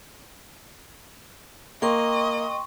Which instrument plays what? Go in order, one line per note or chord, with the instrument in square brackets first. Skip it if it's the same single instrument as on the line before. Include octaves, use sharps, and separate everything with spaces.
[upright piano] A#3 [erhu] D#5 [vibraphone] G5 C6 C#6